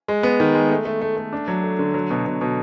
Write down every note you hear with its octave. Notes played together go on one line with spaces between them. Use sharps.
G#3
B3
D#3
G#3
A3
A3
A3
A3
D4
F#3
A3
D3
F#3
B2
B2
B2